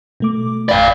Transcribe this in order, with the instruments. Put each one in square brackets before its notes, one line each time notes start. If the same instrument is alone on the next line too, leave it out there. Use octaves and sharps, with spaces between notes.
[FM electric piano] B2 A3 D6
[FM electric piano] G#1 F2 B5 [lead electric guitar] D5 F5